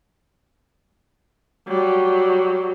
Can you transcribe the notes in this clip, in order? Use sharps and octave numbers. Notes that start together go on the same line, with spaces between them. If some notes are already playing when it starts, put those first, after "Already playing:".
F#3 G3